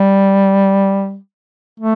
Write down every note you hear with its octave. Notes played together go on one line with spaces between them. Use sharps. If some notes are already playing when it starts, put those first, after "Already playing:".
Already playing: G3
A3